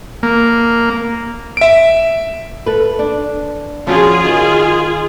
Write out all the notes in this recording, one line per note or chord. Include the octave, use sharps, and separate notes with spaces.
A#3
E5 D7
A4 B4
D4
F3 C#4 F4 F#4 G#4
D#3